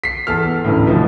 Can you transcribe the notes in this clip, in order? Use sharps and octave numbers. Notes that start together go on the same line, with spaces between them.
B6 C7
E2 A4 F6
A1 D2 A2
B2 E3 F3